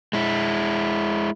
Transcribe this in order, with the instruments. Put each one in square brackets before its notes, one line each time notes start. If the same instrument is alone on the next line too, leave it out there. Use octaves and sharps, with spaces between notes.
[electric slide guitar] G#3 E4